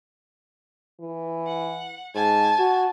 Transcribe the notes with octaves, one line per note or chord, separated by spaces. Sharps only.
E3
F#5
G#2 G#5 A5
F#4